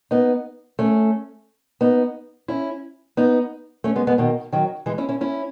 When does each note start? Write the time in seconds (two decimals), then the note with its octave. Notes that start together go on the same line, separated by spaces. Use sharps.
0.11 B3 D#4
0.79 A3 C#4
1.81 B3 D#4
2.48 C#4 E4
3.17 B3 D#4
3.84 A3 C#4
3.95 G#3 B3
4.07 G#3 B3
4.18 B2 D#3
4.52 D#3 F#3
4.86 E3 G#3
4.98 C#4 E4
5.09 C#4 E4
5.21 C#4 E4